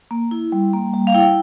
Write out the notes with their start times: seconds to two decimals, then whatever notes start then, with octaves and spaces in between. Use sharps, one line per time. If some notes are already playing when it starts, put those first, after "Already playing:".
0.11 A#3
0.31 E4
0.52 G3
0.73 A#3
0.94 G3
1.07 F5
1.14 E4 G5